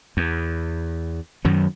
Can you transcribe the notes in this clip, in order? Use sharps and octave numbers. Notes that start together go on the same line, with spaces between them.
E2
F#2 D#3 F#3